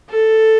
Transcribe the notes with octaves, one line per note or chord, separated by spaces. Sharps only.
A4